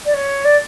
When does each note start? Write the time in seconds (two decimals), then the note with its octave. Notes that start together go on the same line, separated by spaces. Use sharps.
0.05 D5
0.14 C#5
0.44 D5